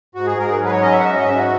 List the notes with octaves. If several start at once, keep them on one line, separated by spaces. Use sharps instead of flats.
G#2 F#4
G#4
G#2 A#4
G#4
F#3
B4
C#5
C#4 D#5
E5
F#5
G#2 E5
D#5
G#2 E5
F#4